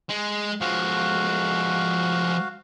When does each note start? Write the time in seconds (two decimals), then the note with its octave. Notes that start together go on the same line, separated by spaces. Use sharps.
0.10 G#3
0.61 F3 G#3 F#4 F5